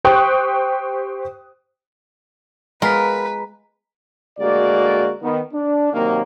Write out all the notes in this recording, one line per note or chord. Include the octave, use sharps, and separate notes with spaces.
G4 C5 G5 C#6 D#6 F#6
G#3 B3 F4 A#4 B4 A#5 B6
D2 G#3 A#3 F#4 D5
D#3 B3
D4
C3 D#3 F#3 A#3